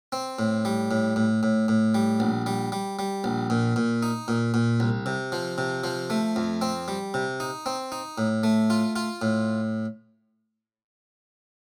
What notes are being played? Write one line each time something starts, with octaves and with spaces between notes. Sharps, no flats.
C4
A2
G3
A2
A2
A2
A2
G3
A#1
G3
G3
G3
A#1
A#2
A#2
D#4
A#2
A#2
C2
C3
F3
C3
F3
A3
F2
C4
G3
C3
D#4
C4
D#4
A2
A3
F4
F4
A2